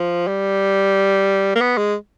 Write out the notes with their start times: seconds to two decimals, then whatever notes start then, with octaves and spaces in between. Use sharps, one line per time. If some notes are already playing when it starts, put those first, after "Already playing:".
Already playing: F3
0.28 G3
1.55 A#3
1.61 B3
1.78 G#3